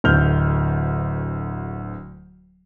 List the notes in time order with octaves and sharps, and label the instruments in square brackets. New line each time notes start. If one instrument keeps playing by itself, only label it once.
[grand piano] D1 D2 F6 G6 F7